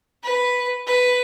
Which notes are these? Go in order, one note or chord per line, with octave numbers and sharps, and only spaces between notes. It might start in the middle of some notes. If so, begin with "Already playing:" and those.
B4
B4